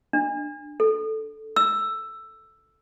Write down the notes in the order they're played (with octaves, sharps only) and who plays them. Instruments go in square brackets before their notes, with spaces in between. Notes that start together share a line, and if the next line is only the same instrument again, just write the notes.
[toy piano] D4
A4
E6